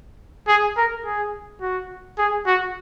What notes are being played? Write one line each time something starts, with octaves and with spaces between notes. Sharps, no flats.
G#4
A#4
G#4
F#4
G#4
F#4